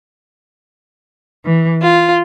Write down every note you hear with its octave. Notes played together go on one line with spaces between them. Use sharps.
E3
F4